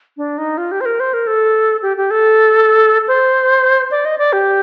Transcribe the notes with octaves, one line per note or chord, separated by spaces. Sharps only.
D4
D#4
F4
G4
C5
A#4
C5
A#4
A4
G4
G4
A4
C5
D5
D#5
D5
G4